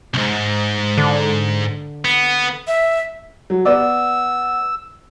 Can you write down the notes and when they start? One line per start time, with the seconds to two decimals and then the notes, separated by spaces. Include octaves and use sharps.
0.14 C2 G#2
0.98 D3
2.05 B3
2.67 E5
3.50 F#3
3.65 B3 D5 E6